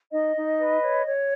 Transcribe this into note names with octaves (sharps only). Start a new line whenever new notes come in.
D#4 D#5
D#4
B4
C#5
C#5